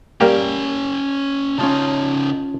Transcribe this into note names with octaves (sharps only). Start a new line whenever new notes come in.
G3 A#3 C#4 G4 G5
C#3 C#4 D#4 F4 A5